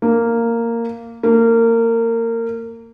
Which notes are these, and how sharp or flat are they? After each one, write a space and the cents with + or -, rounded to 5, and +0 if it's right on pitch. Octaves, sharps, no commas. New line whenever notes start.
A#3 -10
A#3 -25